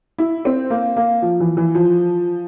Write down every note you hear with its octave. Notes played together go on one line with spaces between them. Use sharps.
E4
C4
A#3
A#3
F3
E3
E3
F3